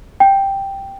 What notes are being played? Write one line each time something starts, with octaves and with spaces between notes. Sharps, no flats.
G5